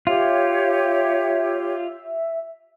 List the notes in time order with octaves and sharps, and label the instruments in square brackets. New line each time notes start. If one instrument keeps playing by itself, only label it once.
[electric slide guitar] F4 [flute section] G4 C#5 [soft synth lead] E5